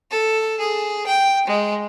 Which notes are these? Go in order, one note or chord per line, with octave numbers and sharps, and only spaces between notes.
A4
G#4
G5
G#3